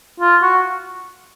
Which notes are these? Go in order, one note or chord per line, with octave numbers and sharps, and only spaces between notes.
F4
F#4